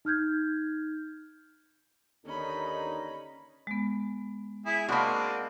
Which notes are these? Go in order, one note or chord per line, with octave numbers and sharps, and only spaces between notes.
D#4 F6 G6 G#6
D#2 D3 C#4 D#4 B5
G#3 B3
E4 G#4
G#3 A#3 C4 D4 F#4 A5 B5 C#6